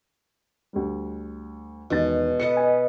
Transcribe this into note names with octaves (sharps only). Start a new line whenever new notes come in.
D2 G3
E1 B2 D#3 A6
A4 B4 D#5 C#7
G#5